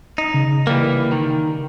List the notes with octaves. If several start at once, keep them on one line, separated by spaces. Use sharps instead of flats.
D#4
C#3
E3 G3 A#3
D#3